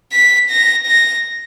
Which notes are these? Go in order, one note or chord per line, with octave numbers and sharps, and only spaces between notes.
B6
A#6
A#6